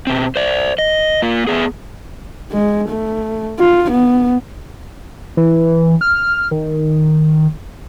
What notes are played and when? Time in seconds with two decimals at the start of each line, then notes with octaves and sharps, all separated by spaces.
0.07 B2 C4
0.36 C5 D5
0.78 D#5
1.22 A#3 F4
1.47 A3 B3 G#4
2.52 G#3
2.89 A3
3.59 F4
3.92 B3
5.37 E3
6.01 F6
6.51 D#3